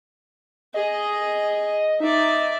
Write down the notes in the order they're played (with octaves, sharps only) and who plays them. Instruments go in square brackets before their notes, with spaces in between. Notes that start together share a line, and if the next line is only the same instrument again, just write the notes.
[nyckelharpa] G#4 [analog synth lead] D#5
[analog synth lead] D#4 [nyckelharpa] D5 E5